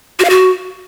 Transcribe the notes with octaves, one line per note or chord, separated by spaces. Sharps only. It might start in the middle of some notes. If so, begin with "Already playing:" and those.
F#4
F5
F#4